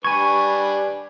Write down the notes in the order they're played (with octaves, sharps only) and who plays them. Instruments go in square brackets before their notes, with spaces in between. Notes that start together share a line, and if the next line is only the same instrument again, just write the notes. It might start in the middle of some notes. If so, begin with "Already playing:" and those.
[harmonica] G3 D4 B4 [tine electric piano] G#5 G#6 [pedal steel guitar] C#6